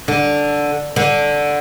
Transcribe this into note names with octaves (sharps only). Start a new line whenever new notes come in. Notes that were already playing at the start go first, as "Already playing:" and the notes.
D3
D3